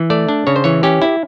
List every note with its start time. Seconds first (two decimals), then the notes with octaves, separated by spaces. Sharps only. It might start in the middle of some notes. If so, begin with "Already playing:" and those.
Already playing: E3
0.10 A3 D5
0.29 D4
0.47 C#3 C#5
0.56 C5
0.64 E3 C#5
0.83 C#4 G4
1.02 E4